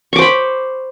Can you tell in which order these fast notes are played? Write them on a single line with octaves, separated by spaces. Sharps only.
C#6 D6 C5 B5